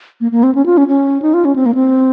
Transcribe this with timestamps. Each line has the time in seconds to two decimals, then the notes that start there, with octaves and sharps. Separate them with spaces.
0.21 A#3
0.32 A#3
0.43 C4
0.55 C#4
0.66 F4
0.77 C#4
0.88 C#4
1.22 D#4
1.34 F4
1.45 C#4
1.56 C4
1.66 A#3
1.75 C4